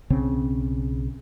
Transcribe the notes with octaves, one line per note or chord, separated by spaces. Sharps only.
B1 C#3 C4